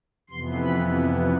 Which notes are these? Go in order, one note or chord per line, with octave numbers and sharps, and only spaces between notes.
F2 C3 E3 B3 C6
B5